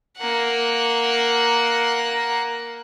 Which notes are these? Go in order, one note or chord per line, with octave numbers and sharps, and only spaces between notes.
A#3 F#5